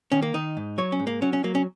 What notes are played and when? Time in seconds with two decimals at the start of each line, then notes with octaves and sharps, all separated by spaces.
0.12 D#3 C#4
0.22 A#3
0.34 D#3 D#4
0.57 G#2
0.78 F#3 C#5
0.92 C#4
0.99 G#2
1.07 A#3
1.22 F#3 C#4
1.33 C#4
1.44 F#3 A#3
1.55 C#4